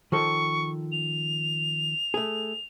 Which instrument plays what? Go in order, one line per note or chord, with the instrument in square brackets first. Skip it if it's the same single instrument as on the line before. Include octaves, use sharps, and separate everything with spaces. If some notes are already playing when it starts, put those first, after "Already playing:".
[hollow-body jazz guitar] D#3 F3 A4 [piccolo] C#6
[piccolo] F7
[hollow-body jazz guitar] A3 G#4